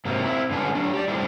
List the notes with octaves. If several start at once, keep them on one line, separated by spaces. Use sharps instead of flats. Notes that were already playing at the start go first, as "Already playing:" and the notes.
G#2 C3 F#3 A#3 C4
C4 E4
G2 D3 G#3 B3 C#4 A5
F#3 D4
G4 D5
A2 G3 G#3 C4 D4 E4